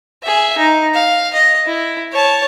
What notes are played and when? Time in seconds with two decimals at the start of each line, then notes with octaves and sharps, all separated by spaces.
0.23 G#4 E5
0.58 D#4
0.94 F5
1.34 D#5
1.66 E4
2.12 C#5 A5